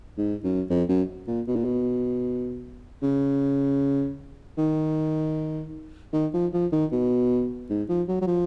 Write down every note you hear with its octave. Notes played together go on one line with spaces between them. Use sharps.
G#2
F#2
F2
F#2
A#2
B2
A#2
B2
C#3
D#3
D#3
F3
F3
D#3
B2
G#2
F3
F#3
F#3
F3